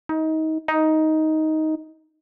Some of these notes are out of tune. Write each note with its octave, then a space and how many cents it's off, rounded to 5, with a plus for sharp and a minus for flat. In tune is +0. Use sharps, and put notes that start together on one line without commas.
D#4 +25
D#4 +10